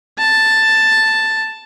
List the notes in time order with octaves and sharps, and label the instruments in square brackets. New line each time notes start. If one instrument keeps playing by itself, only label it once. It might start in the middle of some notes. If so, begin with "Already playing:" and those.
[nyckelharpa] A5